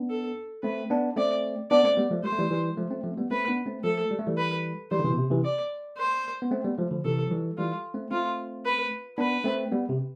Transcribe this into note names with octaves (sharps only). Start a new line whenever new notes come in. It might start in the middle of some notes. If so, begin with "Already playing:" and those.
Already playing: B3 D4
A4
A3 C4 B4
B3 D4
A3 C4 D5
B3 D4 D5
A3 C4
G3 B3
F3 A3
G3 C5
A3
E3 G3
E3 G3
F3 A3
A3 C4
F3 A3
C4
G3 B3
A3 C4 B4
B3 D4
A3 C4
F3 A3 A4
G3
A3
E3 G3
B4
E3 G3 C5
D3
C3 E3
B2
C3
C3 E3
D5
C5
B3
A3 C4
G3 B3
F3 A3
D3 F3
C3 E3 A4
F3
E3 G3
E3 G3 F4
A3 C4
A3 C4 F4
B4
B3 D4 B4
A3 C4
G3 B3
C3